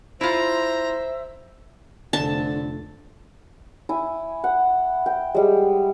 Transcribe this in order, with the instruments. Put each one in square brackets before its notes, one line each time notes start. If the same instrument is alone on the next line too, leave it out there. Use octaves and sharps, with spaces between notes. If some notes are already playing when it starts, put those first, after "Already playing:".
[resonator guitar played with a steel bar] E4 F4 [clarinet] C5 [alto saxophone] E5 [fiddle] A#5
[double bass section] F1 F3 A3 [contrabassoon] D3 [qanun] A5
[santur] E4 G#5
F#5
G5
G3 G#3